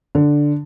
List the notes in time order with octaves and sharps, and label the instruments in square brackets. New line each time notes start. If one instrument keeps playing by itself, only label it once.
[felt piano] D3